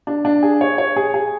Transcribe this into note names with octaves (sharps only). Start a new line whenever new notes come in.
D4
D4
G#4
C#5
C#5
G#4
G#4